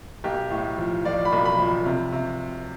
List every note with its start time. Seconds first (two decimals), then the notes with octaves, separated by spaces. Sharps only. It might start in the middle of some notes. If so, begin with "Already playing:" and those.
0.24 B1 G4
0.51 A2
0.78 F3
1.04 F3 D5
1.25 B5
1.32 B1
1.45 B5
1.58 F3
1.86 C3
2.12 C3